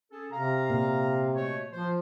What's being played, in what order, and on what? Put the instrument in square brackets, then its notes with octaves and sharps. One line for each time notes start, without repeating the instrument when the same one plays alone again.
[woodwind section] C#4 G#4 A4
[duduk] C3 [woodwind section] F5 A#5
[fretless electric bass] A#2
[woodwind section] B2 A3 C#5
[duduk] F3 [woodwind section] C5